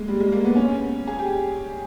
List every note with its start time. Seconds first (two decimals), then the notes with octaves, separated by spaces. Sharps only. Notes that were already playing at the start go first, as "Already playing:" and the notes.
Already playing: G#3 A#3
0.08 G3
0.21 G#3
0.32 A#3
0.45 B3
0.56 C#4
1.07 G#4
1.19 G4